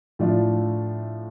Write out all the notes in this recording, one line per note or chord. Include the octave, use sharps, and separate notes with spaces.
A2 F3 D4 F4